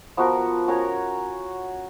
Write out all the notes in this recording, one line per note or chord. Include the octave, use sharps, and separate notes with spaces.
F3 B3 F#4 A#4
C#4 F#4 A#4 C#5